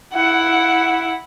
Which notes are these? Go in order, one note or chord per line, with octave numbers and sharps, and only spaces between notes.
E4 F#5